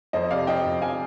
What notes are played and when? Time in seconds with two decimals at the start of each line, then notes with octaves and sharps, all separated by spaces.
0.13 F2 C5 D#5
0.30 C3 D5 F5
0.47 F3 D#5 G5
0.64 F2
0.81 F2 F5 G#5